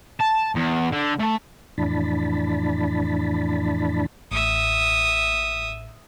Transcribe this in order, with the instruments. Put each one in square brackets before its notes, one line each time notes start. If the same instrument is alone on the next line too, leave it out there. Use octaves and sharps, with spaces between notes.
[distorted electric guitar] A5
E2
D3
A3
[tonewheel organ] F2 A2 E3 D4 A5 B5
[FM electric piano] A1 A2 [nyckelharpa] E5 D#6